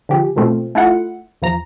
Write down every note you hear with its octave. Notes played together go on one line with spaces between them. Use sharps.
D3 F3 G4 G#4
G#2 B2 G#3 A3 C4 F4
A3 E4 F4 F#5
E2 F3 A#5